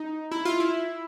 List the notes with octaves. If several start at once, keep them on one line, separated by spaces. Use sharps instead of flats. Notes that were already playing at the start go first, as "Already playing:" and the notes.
Already playing: D#4
E4
F4
E4